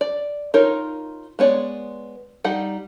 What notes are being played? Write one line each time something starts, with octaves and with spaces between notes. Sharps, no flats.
D5
D#4 F4 A#4 C#5
G#3 B3 C#5 D5
G3 D#4 F#5